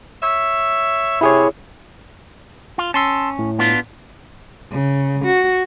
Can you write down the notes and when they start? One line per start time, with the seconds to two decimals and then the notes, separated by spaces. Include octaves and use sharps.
0.21 C#5 E5
1.21 C3 E4 G#4 C#5
2.78 F4
2.94 C#4 A5 C6 E6
3.39 A2
3.59 B3 D4 F4
4.72 C#3
5.25 F#4